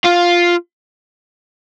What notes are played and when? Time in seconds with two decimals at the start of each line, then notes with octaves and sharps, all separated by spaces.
0.04 F4